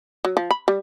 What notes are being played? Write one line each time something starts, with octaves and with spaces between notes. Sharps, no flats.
F#3
F3
B5
G3